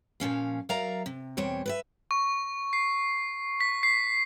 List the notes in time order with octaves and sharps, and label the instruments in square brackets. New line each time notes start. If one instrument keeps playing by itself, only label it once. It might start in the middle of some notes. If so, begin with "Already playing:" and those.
[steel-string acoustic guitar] A#2 F3 C#4 F5
F#3 A#4 D5 E5 F5 A#5
C3
E2 B2 G3 C4 C#5
B4 D5 E5
[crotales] C#6
C7
B6
C7